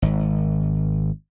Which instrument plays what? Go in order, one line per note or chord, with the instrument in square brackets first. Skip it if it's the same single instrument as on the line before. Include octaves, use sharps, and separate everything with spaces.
[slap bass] G#1